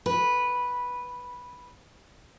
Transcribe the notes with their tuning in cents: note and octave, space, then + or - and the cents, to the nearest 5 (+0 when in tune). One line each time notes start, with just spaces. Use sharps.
B4 -5